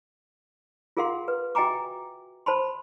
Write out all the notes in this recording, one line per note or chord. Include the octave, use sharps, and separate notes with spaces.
F4 G#4 A#4 F5 F#5 C6
B4
F#4 E5 G5 G#5 A#5 D6
C5 A5 B5 C6